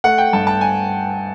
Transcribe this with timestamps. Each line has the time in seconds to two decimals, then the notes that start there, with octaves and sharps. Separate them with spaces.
0.04 A3 F#5
0.18 G5
0.33 G2 A5
0.47 A5
0.61 G#5